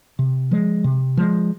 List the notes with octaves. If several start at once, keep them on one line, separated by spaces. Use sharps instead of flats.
C3
F3 G#3
C3
F3 G#3